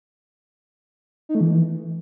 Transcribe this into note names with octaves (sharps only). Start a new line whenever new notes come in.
D#4
A3
E3